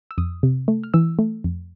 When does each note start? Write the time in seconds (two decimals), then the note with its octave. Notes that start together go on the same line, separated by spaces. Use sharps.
0.11 E6
0.18 F2 D#6
0.43 C3
0.68 A3
0.84 F6
0.94 E3 E6
1.19 A3
1.44 F2